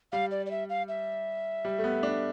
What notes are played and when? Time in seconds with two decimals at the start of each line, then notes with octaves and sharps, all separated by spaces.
0.12 G3 F5
0.31 D5
0.46 D5
0.51 E5
0.70 F5
0.88 E5
1.65 G3
1.79 A3
1.84 B3
2.03 D4